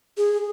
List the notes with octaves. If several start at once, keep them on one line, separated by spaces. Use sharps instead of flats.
G#4